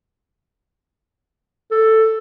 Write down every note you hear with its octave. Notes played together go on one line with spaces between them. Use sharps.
A4